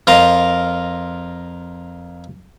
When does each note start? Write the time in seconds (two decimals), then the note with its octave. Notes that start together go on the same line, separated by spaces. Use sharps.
0.07 F2 F4 A#4 D#5 F5